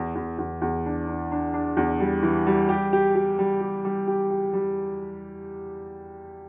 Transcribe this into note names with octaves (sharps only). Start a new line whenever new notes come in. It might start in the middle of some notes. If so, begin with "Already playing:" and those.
Already playing: E2
E2
E2
E2
D4
D4
D4
D4
E2
G3
E3
G3
G4
G4
G4
G3
G4
G3
G4
G4
G3